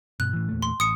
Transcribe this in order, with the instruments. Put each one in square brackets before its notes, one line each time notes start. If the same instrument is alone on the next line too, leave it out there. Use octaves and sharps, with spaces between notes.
[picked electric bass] G2 B2 [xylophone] F#6
[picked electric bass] A2 E3
E2 A#2 A3
[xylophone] C6
[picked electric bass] A1 [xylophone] D#6 C#7